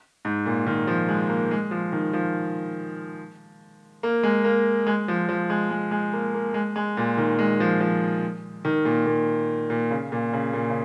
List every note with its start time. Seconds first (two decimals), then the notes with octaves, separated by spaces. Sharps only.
0.25 G#2
0.46 A#2
0.66 D#3
0.87 F3
1.08 G#3
1.29 A#3
1.51 G#3
1.71 F3
1.92 D#3
2.13 F3
4.03 A#3
4.23 G#3
4.44 A#3
4.87 G#3
5.08 F3
5.29 F3
5.50 G#3
5.70 G#3
5.91 G#3
6.13 A#3
6.34 A#3
6.54 G#3
6.76 G#3
6.97 A#2
7.17 D#3
7.39 G#3
7.60 F3
7.80 F3
8.65 D#3
8.85 A#2
9.06 A#2
9.70 A#2
9.91 C#3
10.12 A#2
10.33 C#3
10.53 A#2
10.70 C#3